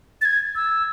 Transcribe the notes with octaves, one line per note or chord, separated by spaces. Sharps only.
A6
G#6
E6